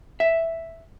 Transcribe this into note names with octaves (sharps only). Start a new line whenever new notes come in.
E5